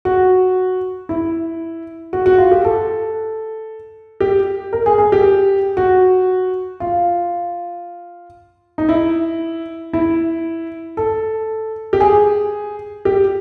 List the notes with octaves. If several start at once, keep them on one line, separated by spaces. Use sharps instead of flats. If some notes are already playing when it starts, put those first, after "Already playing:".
F#4
E4
F#4
F#4
F4
G4
A4
G4
A#4
G#4
G#4
G4
F#4
F4
D#4
E4
E4
A4
G4
G#4
G4